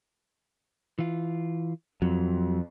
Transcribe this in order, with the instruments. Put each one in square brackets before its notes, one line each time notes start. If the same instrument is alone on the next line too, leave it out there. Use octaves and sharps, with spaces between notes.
[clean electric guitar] E3 F4
[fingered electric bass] F2 [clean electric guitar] F#3